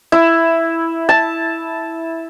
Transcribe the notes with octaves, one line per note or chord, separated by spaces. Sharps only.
E4
A5